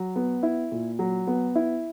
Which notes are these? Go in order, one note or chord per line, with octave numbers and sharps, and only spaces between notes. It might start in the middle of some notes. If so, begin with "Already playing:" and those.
Already playing: F#3
B3
E4
A#2
F#3
B3
E4